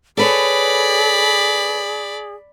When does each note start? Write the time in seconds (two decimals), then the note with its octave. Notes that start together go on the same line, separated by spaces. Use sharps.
0.17 G#4 A4 B4 C#5 D5 B5